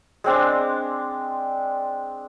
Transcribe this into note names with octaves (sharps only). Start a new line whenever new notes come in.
G#3 C4 D4